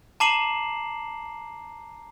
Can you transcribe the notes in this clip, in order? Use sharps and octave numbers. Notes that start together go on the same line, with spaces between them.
A5 A#5 D6 C7 E7 F#7